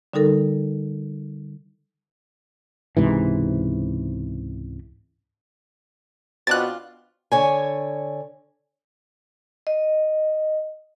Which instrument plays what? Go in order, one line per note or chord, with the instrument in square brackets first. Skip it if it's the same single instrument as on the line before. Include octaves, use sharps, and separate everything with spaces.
[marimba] D3 G3 D#4 A4 A#4
[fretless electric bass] C#2 G#2 C3 E3
[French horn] B2 [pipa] C4 D4 F4 [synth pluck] F#6 A6
[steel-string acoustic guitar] D3 C#5 G#5
[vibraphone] D#5